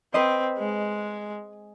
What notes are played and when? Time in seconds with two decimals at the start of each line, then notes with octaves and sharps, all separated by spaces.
0.14 C4 B4 C5 D#5
0.58 G#3